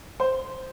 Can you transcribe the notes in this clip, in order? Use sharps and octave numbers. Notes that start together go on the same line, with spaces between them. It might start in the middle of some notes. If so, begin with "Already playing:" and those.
C5